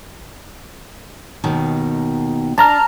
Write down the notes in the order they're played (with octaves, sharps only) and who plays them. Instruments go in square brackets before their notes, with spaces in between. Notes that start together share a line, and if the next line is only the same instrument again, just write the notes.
[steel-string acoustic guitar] D#2 B2 D#3
[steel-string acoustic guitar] D4 [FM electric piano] A5 A#5 F6